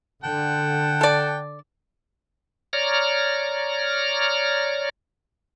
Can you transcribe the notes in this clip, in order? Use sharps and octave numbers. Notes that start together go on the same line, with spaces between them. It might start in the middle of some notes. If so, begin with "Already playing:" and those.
D3 F#5 G5 A5
A4 D5
C#5 D5 A#5 F6